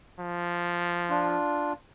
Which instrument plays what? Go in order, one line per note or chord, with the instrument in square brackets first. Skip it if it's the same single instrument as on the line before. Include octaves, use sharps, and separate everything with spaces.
[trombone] F3
[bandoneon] D4 F4